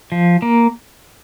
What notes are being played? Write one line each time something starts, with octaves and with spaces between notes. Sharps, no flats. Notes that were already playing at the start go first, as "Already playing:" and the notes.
F3
A#3